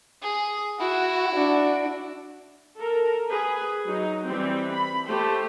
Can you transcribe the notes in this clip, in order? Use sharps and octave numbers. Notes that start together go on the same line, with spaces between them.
G#4
E4 F#4
D4 F#4
A4 A#4
G#4 B4
F#3 D#4
E3 G3 C4
B5
A3 G4 C5